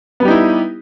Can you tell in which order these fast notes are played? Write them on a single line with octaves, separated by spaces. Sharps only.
B3 G3 G4 D#4 E4